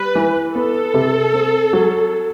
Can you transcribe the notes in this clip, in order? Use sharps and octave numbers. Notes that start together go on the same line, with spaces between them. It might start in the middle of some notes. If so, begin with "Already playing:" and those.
Already playing: G3 B4
E3
B3 A4
C3
C4
F#3